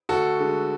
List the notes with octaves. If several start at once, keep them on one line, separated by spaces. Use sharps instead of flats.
D2 F#4 A4
D3 G#3